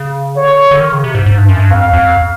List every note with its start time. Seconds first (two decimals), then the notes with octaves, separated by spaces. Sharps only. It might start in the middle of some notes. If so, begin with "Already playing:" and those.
Already playing: C#3
0.36 D3 C#5
0.71 D3
0.80 D#3
0.93 C#3
1.04 C3
1.15 G#2
1.26 G#2
1.38 G2
1.48 F#2
1.59 G2
1.70 F2 F5
1.93 F2